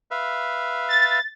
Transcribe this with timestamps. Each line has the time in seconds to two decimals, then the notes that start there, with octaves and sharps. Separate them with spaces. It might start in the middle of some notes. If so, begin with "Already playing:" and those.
0.11 B4 E5 F5
0.89 A6